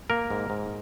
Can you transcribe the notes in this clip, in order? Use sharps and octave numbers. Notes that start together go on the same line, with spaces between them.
A#3 A#4
G#2
G#2